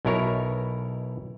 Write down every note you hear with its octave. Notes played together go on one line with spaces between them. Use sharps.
B1 B2 E4 A#4 C#5